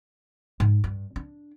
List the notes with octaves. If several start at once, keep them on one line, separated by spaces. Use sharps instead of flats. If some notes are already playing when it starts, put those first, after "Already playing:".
G#2
G2
D4